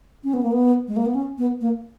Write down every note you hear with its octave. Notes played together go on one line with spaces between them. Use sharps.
C#4
B3
A#3
B3
G#3
A#3
B3
C#4
B3
A#3